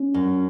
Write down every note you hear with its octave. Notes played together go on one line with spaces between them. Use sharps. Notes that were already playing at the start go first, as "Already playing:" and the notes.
Already playing: C#4
F#2